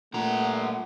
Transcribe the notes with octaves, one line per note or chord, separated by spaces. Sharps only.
G2 A#2 A3 F#5 A#5